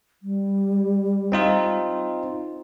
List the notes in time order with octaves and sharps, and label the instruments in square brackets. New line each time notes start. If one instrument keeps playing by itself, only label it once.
[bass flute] G3
[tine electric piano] C4 D#4 F4